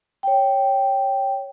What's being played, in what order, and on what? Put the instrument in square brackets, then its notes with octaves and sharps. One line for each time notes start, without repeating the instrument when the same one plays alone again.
[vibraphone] C#5 G5